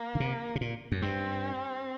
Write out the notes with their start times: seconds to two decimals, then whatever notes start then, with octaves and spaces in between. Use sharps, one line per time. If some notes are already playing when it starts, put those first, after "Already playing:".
Already playing: A#3
0.15 D3
0.20 C3
0.55 C3
0.61 A#2
0.92 F#2
1.02 G2 C4